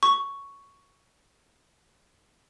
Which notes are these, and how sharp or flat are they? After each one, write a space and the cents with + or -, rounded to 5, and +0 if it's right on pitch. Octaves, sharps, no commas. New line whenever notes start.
C#6 +5